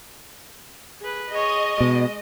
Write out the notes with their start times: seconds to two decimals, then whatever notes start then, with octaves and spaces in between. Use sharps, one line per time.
1.01 G#4 B4
1.31 G#4 C#5 D#5
1.80 B2 G#3